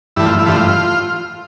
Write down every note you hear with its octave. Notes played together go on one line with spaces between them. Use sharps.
G2 E3 A3 E4
F4
E4
G2 E3 A3 F4